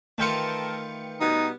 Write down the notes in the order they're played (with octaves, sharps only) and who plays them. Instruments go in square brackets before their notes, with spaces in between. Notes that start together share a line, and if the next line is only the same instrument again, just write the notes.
[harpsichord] D#3 E3 F4 [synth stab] A3 G5 C#7 [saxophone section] A4 A#4
[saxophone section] B2 G3 B3 [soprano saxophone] D#4